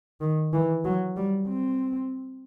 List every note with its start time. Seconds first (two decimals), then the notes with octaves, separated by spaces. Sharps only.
0.21 D#3
0.53 E3
0.86 F#3
1.17 G3
1.49 C4